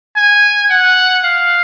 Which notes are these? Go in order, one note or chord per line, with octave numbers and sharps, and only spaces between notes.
G#5
F#5
F5